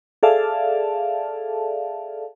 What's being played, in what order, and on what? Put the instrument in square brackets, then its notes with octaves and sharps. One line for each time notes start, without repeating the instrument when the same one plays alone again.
[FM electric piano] G#4 A4 D5 E5 F5 A5